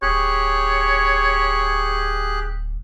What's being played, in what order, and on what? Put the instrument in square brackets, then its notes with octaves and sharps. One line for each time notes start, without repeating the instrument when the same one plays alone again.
[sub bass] D1 [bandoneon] G4 G#4 F#6 [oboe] C#5